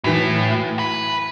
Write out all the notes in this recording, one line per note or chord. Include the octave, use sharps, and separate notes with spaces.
A2 E3 F#3
B4